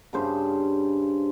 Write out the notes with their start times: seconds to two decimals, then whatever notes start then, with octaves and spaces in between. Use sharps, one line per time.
0.13 G2 C#3 C5 G5